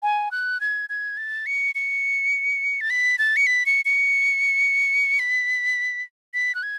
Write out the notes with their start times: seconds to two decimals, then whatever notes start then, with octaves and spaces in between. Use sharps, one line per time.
0.03 G#5
0.31 F#6
0.61 G#6
0.89 G#6
1.17 A6
1.46 C#7
1.75 C#7
2.81 A6
2.90 B6
3.18 A6
3.36 C#7
3.47 B6
3.66 C#7
3.85 C#7
5.19 B6
6.34 B6
6.55 F#6
6.63 G#6